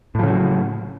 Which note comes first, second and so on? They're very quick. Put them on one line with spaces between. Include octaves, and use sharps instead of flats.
A2 F3 C#3 F#3